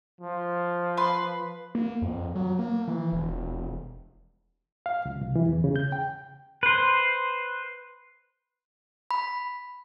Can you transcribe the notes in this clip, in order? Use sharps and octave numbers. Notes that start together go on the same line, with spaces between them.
F3
B4 C6
A#3
F2
F#3
A#3
E3
E1
E1
F5
C#2
C2
E3
E2
C#3
G6
G5
B4 C5
B5